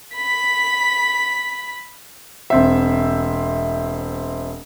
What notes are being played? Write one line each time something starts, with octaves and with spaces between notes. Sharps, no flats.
B5 B6
E1 C4 E5